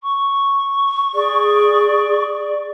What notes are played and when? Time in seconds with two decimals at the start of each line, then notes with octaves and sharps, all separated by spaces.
0.02 C#6
1.15 G#4 D5